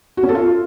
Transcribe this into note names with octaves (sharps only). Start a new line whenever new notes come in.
F#4
C#4
A4
F4